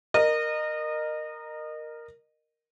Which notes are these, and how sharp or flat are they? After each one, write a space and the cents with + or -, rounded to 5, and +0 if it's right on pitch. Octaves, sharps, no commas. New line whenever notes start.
A#4 +0 D#5 -25